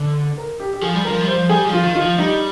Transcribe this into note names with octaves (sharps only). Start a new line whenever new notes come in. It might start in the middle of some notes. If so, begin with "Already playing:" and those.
Already playing: D3
A#4
G4
G4
F3 G#4
G3
F3 A#4
G3
C5
F3
G3 G#4
F3
F4
D#3
F4
F3
G3 D#4